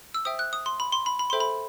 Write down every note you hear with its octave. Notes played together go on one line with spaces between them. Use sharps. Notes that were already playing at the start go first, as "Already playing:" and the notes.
E6
C5 E5 G5 D#6
F#6
D#6
C6
B5
C6
B5
B5
A4 C5 E5 G5 C6
B5